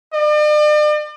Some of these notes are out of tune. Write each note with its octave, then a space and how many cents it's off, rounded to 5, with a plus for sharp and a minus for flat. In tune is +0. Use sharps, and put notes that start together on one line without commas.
D5 +45